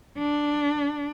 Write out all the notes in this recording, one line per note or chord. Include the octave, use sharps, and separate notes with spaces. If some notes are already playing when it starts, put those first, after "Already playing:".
D4